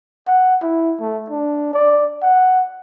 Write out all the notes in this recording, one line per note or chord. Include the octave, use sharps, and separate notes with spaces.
F#5
E4
A3
D4
D5
F#5